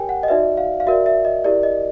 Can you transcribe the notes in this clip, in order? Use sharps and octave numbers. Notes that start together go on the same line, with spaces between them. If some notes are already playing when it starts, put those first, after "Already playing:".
Already playing: G4 A#4 C#5 G5 G#5
F#5
D#5
D#4 F#4 B4 D5 E5
F5
F5
F#4 A#4 D5 E5
E5
D#5
E4 G4 A#4 D5
D#5